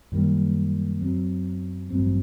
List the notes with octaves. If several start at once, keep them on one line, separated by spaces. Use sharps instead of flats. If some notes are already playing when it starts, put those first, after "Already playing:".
F#2 D#3 G3 A#3
F#2 F#3 C4
A1 G2 F#3 C4